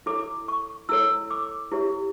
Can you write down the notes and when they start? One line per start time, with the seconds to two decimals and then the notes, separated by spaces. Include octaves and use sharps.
0.06 E4 A4 C#5 D6
0.48 C#6
0.89 E4 A4 C#5 E6
1.31 D6
1.72 E4 G4 C#5